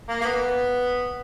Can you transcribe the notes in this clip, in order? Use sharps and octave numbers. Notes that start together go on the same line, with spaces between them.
A#3
A#3
B3